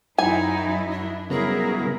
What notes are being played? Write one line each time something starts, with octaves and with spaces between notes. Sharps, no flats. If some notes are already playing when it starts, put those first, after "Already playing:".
F#2 F#3 D#4 E4 D#5 G#5
D4
C#3 F#3 G3 B3 E4 G#4 A#4